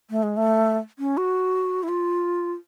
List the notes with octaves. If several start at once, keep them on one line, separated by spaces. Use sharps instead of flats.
A3
G#3
A3
C#4
F#4
E4
F4